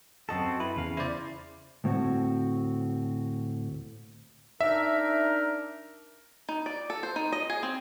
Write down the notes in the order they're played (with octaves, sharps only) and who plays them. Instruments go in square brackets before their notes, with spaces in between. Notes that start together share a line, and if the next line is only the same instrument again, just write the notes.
[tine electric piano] F#2 D#5 A5 [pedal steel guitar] C4 F#4 A4
[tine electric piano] E4 [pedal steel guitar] B4
[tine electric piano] E2 [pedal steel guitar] C#3 F5
[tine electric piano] E4 C5 D5
[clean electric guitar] D2 A2 C4 F#4
[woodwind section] D4 D#4 A#4 [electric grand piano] E5
[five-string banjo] D#4
D5
A4
C5
D#4
D#5
G#4
C4